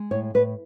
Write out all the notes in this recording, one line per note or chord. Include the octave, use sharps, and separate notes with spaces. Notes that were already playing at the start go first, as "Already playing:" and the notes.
Already playing: G#3
A2 C#5
A2 B4